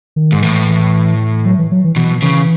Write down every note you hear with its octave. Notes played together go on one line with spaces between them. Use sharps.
D#3
G#2
A2 E3
F#3
E3
F#3
E3
B2 E3
C#3 E3